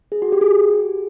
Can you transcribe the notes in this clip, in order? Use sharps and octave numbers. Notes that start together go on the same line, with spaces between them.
G#4
F#4
G4
G#4